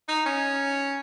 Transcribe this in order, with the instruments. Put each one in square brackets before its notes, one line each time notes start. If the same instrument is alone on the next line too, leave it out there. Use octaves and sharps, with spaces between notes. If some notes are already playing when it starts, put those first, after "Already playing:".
[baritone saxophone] D#4
C#4